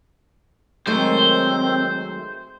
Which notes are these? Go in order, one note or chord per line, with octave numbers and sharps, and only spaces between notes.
D#3 F#3 G#3 A3 C4 C5